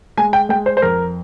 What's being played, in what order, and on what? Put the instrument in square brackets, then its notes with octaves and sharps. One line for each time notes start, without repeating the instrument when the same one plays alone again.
[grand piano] G#3 G#5
G5
G#3 G5
C5
C5
F2 A#4